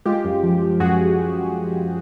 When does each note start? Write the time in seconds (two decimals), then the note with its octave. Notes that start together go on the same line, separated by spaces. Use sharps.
0.06 G#3 F4 G4
0.25 F#2
0.43 F3
0.62 F3
0.80 F#2 F#4 G#4